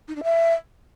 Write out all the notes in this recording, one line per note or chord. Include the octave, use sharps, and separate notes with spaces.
D#4
D4
E5